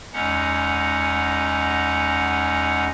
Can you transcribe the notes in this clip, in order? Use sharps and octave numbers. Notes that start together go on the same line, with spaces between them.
E2 G#3 C#4 D#4 F#5